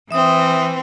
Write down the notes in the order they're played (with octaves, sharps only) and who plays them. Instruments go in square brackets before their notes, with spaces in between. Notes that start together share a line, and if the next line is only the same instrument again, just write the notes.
[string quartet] E3 C4 [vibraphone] E5 D#6